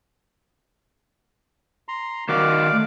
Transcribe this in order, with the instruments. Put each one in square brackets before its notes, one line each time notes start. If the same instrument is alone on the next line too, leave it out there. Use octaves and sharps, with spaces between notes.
[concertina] A#5 C6
[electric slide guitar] D#3 F#4 [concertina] D5 F5 D6
[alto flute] A3